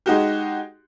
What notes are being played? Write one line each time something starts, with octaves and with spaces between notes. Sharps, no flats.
G#3 D#4 F#4 G4